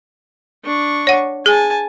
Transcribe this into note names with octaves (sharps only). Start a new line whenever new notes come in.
D4 C#6
C#5 F#5
G#4 G#5 A5